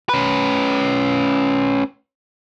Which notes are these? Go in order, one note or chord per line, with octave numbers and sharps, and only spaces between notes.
C#4 B4